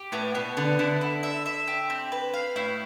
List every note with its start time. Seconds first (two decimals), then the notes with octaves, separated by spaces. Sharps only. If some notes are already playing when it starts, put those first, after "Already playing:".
Already playing: G4
0.12 A2 B3
0.35 B2 B3
0.57 D3 B3
0.79 D3 E4
1.01 E4
1.23 E5
1.46 E5
1.67 G4
1.90 C4
2.12 B4
2.34 F5
2.56 A2 E4